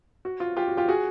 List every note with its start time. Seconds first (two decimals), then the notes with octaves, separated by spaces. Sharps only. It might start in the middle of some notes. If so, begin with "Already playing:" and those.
0.25 F#4
0.40 F4
0.57 F4 G4
0.68 F#4
0.77 F4 G4
0.88 F#4 G#4